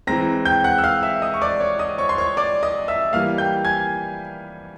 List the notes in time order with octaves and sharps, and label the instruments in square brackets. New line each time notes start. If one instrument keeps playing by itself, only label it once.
[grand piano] E3 G#3 C4 A#5 A#6
G5 G6
F#5 F#6
E6
F5 F6
E5 E6
D#5 D#6
C#6
D5 D6
C#5 C#6
D#5 D#6
C#5 C#6
C6
C#5 C#6
D5 D6
D#5 D#6
E5 E6
E3 G3 A#3 F5 F6
G5 G6
G#5 G#6